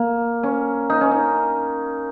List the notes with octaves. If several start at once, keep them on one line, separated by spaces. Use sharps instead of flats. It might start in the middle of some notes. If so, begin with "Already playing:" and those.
Already playing: A#3
C#4
D#4
C#4
D#4